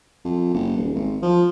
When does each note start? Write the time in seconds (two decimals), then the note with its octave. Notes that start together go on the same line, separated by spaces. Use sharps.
0.25 F2
0.54 F#1
0.77 D#1
0.95 G#1
1.22 F3